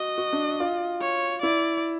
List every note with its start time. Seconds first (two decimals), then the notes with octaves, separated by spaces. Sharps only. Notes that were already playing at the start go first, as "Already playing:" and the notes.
Already playing: F#4 D#5
0.18 F#4
0.33 D4
0.60 F4
1.01 C#5
1.43 E4 D5